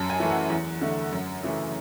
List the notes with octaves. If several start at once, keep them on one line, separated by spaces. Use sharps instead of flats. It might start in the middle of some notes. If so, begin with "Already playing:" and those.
Already playing: F#2 A5
G#5
E3 A3
F#5
E2
D3 A3
F#2
C#3 E3 A3